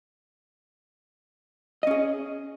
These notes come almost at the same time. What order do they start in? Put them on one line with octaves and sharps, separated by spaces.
D#5 C#4 G#4